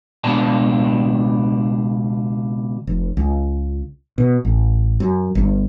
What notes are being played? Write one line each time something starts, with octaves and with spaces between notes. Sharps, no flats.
C#2 B2 D4 A5
F1
C#2
B2
A1
F#2
G1